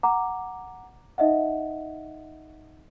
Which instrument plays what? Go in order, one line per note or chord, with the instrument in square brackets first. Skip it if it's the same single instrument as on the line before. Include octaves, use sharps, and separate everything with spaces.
[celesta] F#5 A#5 D6
D#4 D#5 E5 F#5